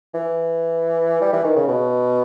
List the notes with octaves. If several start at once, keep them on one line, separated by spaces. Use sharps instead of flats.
E3
G3
E3
D#3
C#3
B2